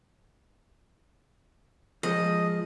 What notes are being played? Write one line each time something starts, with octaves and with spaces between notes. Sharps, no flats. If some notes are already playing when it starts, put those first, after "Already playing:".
F3 G#3 D#5